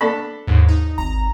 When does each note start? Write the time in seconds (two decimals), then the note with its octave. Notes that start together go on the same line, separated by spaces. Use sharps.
0.01 D4 A4 B5
0.47 D#2 G#2
0.69 D#4
0.98 G#1 A#5